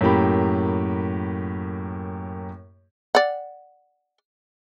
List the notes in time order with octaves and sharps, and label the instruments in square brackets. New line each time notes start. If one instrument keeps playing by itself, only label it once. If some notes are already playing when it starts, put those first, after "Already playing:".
[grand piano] F#2 A2 A#3 G4 B5
[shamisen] D5 F#5